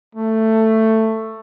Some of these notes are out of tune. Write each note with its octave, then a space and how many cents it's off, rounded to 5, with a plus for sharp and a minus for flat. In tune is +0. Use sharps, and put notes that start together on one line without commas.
A3 +10